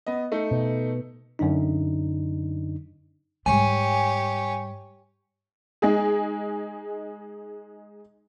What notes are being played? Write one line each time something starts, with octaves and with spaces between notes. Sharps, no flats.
B3 D#5
A3 D#4
B2
F#2 D3 D4 D#4
G#2 G3 G4 C#5 G#5
G#3 D#4 G#4